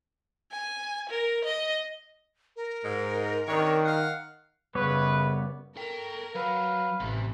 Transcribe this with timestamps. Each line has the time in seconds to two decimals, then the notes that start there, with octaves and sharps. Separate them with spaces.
0.51 G#5
1.09 A#4
1.44 D#5
2.56 A#4
2.85 G#2
3.48 C3 D#3 D4 C#5
3.86 F5 F#5
4.75 F#2 C#3 G3 B3 B4 C#5
5.77 A4 A#4 G5
6.36 F#3 B4 F5
7.00 A1 C3 E3